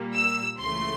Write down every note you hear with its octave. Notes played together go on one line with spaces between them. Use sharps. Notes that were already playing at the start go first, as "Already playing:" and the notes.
Already playing: A#2 G3 A#3
E6
C#2 C#3 E3 A3 C6